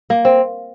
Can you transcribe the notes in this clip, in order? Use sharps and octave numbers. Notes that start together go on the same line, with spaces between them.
A#3
C4